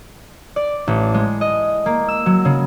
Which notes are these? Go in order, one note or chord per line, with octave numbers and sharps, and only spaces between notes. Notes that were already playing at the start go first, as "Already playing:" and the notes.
D5
A1
G#3
D#5
A#3
E6
F#3
C#3